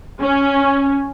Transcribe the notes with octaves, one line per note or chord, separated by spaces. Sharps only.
C#4